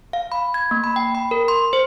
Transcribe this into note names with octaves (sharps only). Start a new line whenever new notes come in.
F5
B5
G#6
A#3
B5
G5
B5
A#4
C6
C5